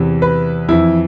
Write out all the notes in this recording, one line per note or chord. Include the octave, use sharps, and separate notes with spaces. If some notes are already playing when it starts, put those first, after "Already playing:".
Already playing: E2 C3 E3
B4
F2 E3 E4